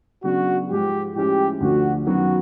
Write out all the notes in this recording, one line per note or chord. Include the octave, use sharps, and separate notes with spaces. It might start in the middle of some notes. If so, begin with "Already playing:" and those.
C#3 F#3 B3 D4 F#4
G#2 F3 G#3 G4
A2 F3 G#3 C#4 E4 G4
D2 D3 F3 F#4
F#2 D#3 F#3 B3 F#4